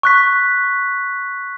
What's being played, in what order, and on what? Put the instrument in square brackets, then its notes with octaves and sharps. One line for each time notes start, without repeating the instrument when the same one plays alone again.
[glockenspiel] C#6 F#6 B6